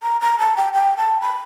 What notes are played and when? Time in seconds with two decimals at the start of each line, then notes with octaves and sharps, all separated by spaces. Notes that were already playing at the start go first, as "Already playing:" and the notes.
0.03 A#5
0.21 A#5
0.39 A5
0.57 G5
0.73 G5
0.97 A5
1.21 B5